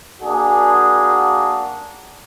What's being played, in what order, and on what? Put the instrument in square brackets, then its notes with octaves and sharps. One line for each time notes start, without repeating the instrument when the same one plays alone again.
[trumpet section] A#3 D4 F#4 G#4